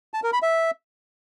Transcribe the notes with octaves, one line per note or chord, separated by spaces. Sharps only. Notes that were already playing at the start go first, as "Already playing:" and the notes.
A5
A#4
B5
E5